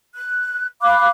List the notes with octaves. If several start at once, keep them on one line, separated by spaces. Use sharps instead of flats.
F#6
F5 B5 D6 F#6